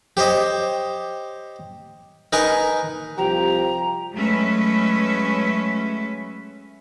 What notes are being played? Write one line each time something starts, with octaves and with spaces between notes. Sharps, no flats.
G4 C5 C#5 D#5
D#4 A#4 B4 G#5 A#5 C#6
C2 F3 G4 A#5
F#3 G#3 A3 C#4 B4 E5